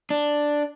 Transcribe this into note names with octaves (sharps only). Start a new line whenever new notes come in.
D4